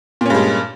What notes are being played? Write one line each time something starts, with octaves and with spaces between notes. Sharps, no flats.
G2 A#2 G#3 C#4